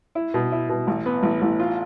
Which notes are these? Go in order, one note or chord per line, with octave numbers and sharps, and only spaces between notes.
E4
B2
E4
B2
A1
B3
A1
A1
F4